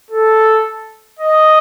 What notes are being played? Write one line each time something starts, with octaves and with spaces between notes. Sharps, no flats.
A4
D#5